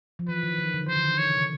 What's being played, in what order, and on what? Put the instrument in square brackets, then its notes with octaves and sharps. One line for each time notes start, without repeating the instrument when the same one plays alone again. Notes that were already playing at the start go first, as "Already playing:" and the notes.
[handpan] F3
[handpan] E3 [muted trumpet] B4
[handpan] D#3
D#3
D3
[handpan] D#3 [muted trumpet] C5
[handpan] D3
D#3
[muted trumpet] C#5
[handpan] C3
C#3